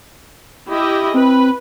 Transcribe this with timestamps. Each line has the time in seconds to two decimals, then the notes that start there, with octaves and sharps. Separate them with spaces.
0.70 E4 G4 D#5
1.14 C4 B4